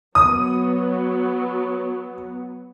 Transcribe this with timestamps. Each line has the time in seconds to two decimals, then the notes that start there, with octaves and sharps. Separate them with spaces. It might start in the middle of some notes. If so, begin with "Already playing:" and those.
0.15 F#3 B3 D#6